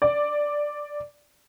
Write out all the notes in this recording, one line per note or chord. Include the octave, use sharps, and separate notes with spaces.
D5